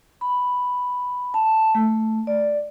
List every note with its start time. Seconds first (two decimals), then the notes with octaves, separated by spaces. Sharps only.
0.21 B5
1.34 A5
1.75 A3
2.27 D5